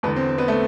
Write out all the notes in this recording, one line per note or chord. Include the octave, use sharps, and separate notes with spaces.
E2 D3 B3
C4
C4
B3
A3